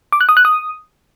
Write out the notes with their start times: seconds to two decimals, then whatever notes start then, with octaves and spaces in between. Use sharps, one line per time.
0.12 D6
0.21 F#6
0.29 D#6
0.37 F#6
0.45 D#6